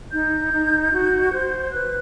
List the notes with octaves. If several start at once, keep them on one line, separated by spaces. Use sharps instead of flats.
D#4 G6
D#4
F#4
C5
B4 F#6